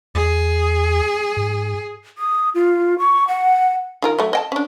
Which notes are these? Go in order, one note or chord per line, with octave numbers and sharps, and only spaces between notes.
E2 G#4
G#2
D#6
F4
C#6
F#5
D#3 F4 A#4
F#3 A3
D#5 G5 A5
C#4 D4